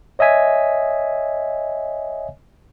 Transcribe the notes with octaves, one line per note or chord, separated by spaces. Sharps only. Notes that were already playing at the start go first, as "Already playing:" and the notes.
C#5 D#5 E5 G#5 B6